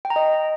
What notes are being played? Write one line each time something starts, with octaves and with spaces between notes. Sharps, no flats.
G5
A#5
D#5